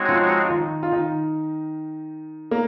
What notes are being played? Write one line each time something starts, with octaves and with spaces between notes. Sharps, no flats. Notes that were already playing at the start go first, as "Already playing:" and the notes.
Already playing: G#3 C4 D#4 F#4 C#5
F3 F4
F4
D#3 D#4
F4
D#3 D#4
A#3